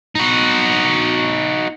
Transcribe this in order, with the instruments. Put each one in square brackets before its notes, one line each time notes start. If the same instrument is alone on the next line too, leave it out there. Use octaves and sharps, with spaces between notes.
[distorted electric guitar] D#4 F#4